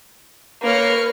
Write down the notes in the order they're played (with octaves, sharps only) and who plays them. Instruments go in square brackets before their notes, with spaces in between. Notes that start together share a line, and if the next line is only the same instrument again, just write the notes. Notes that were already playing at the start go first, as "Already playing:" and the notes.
[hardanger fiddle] A#3 [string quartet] B4 C#5 F6